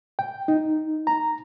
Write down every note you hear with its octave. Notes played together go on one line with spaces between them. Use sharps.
G5
D#4
A#5